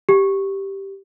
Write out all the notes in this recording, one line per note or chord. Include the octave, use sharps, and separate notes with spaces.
G4